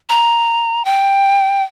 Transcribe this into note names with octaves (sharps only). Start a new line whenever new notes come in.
A#5
G5